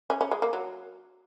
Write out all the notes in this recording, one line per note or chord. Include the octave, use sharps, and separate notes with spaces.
C#4
C#4
G#3
A#3
F#3